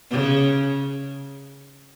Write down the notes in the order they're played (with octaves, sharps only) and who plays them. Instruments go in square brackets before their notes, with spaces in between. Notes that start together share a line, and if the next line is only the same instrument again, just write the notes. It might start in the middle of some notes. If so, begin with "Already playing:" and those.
[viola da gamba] C#3